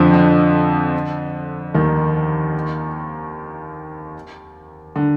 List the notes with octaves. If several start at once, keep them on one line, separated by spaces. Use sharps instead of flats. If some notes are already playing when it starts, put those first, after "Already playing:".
Already playing: F2 D3 F3
D3
D#2 D#3
D3